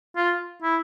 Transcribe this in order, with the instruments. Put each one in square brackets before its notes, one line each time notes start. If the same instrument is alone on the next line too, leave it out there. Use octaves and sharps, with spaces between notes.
[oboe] F4
E4